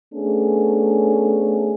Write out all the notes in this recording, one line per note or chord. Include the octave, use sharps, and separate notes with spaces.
A3 B3 C#4 D4 G#4